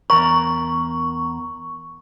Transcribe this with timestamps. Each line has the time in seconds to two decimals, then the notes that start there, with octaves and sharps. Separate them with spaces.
0.10 E2 A#4 C#6